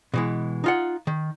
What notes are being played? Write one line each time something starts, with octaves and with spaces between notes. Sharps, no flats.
B2 E3 G#3
D#4 F4 F#5
D#3